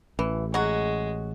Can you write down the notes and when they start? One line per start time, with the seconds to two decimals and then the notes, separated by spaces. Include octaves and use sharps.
0.19 A1 E3
0.54 F#3 G#3 F#4